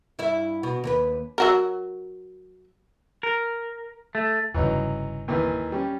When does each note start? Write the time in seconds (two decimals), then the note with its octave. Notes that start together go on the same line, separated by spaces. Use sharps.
0.19 G2 E4 E5
0.63 B2
0.84 D#2 G4 B4
1.38 F#3 F#4 A#4
3.23 A#4
4.15 A3
4.54 F1 G2 C#3 E3 F#3 D#4
5.28 D#2 A#2 E3
5.72 G3 C#4